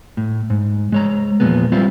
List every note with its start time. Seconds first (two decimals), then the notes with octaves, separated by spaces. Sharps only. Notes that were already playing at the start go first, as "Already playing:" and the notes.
0.17 A2
0.50 G#2
0.92 G#3 C#5 A#5
1.40 E2 A#2 F3 G#3 B3
1.72 G3 C4 E4 F4